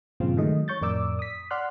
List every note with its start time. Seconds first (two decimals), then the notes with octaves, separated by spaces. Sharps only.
0.20 G2 A#2 C#3 F3 C4 F4
0.37 D#3 F#3 G#3 A3 D#5
0.68 C#5 C#6 G6 A6
0.81 F2 A2 A#4 D5 D6 E6
1.19 D#6 B6
1.51 D5 F#5 C6 F6 F#6